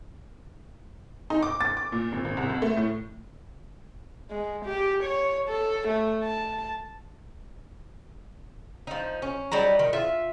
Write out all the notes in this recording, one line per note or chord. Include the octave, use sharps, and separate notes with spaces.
D#4
D6
A6
D6
A#2
G#1
G#1
C2
F2
A3
A2
G#3
G4
C#5
A4
A3
A5
F3 D#4
C#4
F#3 G3 D#4 A#5
D#3
F4 E5